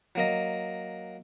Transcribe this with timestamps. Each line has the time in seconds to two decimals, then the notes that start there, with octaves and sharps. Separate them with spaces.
0.15 F#3 A#3 D#5